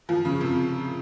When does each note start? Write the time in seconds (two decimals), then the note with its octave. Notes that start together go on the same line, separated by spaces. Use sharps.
0.09 F3
0.25 C#3
0.41 C3